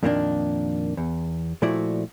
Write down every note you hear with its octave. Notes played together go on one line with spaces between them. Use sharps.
F2 A#2 D#3 A#3 C4 D4
E2
A#2 F3 A3 E4 F#4 D5